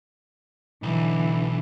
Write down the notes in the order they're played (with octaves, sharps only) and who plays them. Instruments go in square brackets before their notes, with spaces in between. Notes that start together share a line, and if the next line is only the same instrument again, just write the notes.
[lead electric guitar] B1 [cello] D3 E3